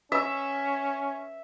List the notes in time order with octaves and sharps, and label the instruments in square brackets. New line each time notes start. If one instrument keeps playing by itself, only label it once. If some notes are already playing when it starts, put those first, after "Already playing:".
[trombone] C#4 [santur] E5